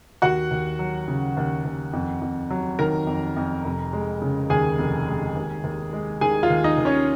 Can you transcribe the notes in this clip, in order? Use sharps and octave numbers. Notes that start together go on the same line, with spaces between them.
D#2 F#4 F#5
D#2
F#3
C#3
D#2
D#2
F2
F2
F#3
D#3 A#4 A#5
F2
F2
F1
G#3
C#3
D#2 G#4 G#5
F1
G#3
D#2
D#2
G#3
D#3 G#4 G#5
F4 F5
D#2
D#4 D#5
D#2
C#4 C#5